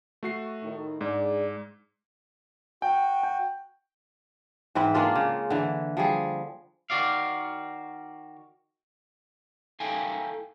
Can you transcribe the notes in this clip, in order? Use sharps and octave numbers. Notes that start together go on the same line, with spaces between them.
A3 F#4 C7
A2 D#3
G#2 D4 G#4 D5
F#4 G5
G5
G#2 E3 C4 B4
G#3 A#3 D4 F4
C#3
D3 E3
F3 G3 G#4
D#3 F#4 D5 F5
E4 A4 F5 G5 G#5